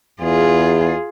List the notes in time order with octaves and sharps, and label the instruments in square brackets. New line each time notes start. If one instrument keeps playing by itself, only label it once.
[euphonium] E2 [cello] F4 G#4